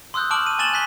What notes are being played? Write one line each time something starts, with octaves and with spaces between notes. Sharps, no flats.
C6 D#6 E6 F#6 G6
A5 C#6 D6 F6 D7 F#7
D#7
G#5 C#6 A6 E7 F#7 G7
G#5 F#6 B6 G7